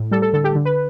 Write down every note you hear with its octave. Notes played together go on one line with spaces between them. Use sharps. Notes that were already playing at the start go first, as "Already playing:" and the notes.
Already playing: A2
G3 A4
A4
D3 A4
G4
D3
B4